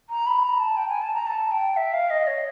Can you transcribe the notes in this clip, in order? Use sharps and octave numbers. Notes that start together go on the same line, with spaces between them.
A#5
B5
A#5
A5
G5
G#5
A5
A#5
A5
G5
E5
F5
D#5
C#5